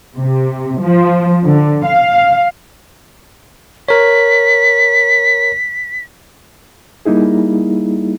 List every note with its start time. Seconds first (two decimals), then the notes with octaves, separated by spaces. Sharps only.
0.17 C3
0.81 F3
1.45 D3
1.86 F5
3.89 A#4 C#5 B6
7.06 G3 A#3 D#4 E4 G#4